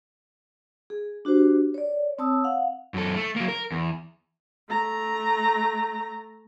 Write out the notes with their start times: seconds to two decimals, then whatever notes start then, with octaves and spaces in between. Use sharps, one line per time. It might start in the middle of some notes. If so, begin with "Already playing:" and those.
0.90 G#4
1.25 D4 F#4 G4 C5
1.74 C#5 D5
2.18 C4 C#5 A5 D#6 E6
2.44 F5 F#5
2.94 F#2 A4
3.16 A3
3.36 F#3 A#3
3.48 A#4
3.72 E2
4.70 A3 A#5